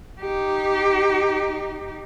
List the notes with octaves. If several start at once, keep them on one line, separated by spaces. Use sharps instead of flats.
D#4 G4